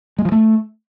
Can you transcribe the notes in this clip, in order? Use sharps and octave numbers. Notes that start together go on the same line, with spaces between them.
G#3
F3
A3